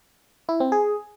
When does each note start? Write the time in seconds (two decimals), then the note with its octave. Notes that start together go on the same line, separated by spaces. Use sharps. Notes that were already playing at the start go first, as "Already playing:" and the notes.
0.49 E4
0.60 C4
0.72 G#4